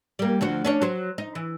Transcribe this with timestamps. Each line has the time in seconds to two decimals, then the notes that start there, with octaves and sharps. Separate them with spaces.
0.19 G3 A#3
0.41 D2 F3 F#4
0.65 C#4 D4 C#5
0.82 F#3 C5
1.18 D#4
1.35 E3